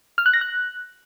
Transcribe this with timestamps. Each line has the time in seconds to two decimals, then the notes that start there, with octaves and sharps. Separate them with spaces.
0.18 F6
0.26 F#6
0.33 A#6
0.41 F#6